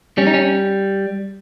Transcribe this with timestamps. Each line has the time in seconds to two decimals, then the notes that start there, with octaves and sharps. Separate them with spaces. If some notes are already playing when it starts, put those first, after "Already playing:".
0.18 G3 C#4
0.27 D#4
0.34 C#4